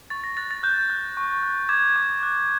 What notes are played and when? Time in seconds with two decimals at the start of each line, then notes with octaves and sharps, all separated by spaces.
0.10 C#6 A6
0.24 A#6
0.37 F#6 A6
0.51 A6
0.63 F#6 G6
0.90 F#6
1.17 C#6
1.43 F#6
1.69 D6 G#6
1.96 D6
2.23 F#6